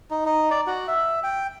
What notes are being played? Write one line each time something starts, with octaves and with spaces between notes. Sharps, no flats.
D#4
D#4
D5
F#4
E5
G5